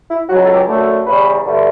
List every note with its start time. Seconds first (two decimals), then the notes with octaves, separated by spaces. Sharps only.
0.11 E4
0.29 C#2 C#3 F#3 F#4
0.43 A4
0.55 G4
0.68 F#2 D3 A3 A4
1.06 E2 C#3 G3 B4
1.44 G2 D3 A3